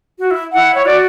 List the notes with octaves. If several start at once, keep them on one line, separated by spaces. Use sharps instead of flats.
F#4
E4
E4 F#5
C#5
F#4 D5